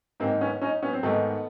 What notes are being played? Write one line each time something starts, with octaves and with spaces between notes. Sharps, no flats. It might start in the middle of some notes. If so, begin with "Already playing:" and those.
G#2 D#3 A#3 C4
B3 C#4
C#4 D#4
B3 C#4
C4
G#2 D#3 A3 B3